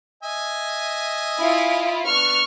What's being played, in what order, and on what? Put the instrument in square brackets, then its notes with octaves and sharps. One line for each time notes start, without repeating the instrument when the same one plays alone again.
[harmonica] D#5 E5 G#5
[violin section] E4 F4
[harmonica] B3 D4 [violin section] C#6 F6